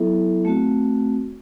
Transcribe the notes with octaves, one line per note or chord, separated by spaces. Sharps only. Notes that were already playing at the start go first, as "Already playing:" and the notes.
Already playing: F#3 B3 E4 A4 E5
A3 C4 F#4